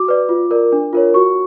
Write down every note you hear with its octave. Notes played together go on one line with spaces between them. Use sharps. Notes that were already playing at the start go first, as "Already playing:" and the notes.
Already playing: F#4 D6
B4 D5
F4
A#4 D5
D4
F4 A#4 C#5
F#4 C#6